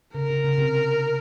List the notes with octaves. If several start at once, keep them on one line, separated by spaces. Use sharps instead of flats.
C#3 A#4
C#3
C#3
C3